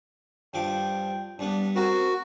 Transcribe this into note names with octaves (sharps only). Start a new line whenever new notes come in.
G2 F3 G5 D6
G2 B3 D4
C4 F#4 A#4